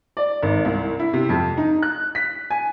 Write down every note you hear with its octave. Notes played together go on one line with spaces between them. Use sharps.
D5
G#1
C2
E4
C3
F2
D#4
F#6
B6
G#5